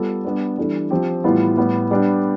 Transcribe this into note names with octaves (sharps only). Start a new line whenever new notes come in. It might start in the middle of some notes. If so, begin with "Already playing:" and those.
Already playing: G3 B3 F4 A4
G3 B3 D4
E3 G3 D4 A4
F3 C4 G4
A2 E3 G3 B3 F4
A2 G3 B3
G3 B3 D4 G4